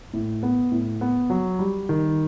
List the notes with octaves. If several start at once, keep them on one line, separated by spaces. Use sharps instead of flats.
A2
B3
A2
B3
F#3
G3
D#3